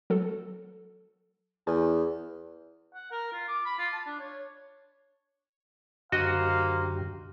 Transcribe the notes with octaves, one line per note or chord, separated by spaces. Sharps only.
F#3 A4
E2 G#5
F#5
A#4
F4
D6
B5
F4
A5
D4
C#5
F#2 D3 A#3 F#4 G4 C5 D#5 F5